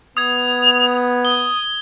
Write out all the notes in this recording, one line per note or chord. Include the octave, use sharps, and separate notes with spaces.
B3 D#6 G#6 F7
D#6 G7